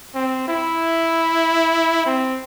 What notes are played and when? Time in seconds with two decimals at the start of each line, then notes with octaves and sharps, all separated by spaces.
0.15 C4
0.48 E4
2.06 C4